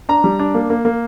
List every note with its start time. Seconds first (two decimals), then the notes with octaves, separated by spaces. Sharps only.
0.09 D4 A#5
0.24 G3
0.39 D4
0.54 A#3
0.70 A#3
0.85 A#3